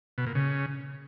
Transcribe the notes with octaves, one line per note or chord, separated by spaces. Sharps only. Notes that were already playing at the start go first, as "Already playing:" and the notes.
B2
A#2
C#3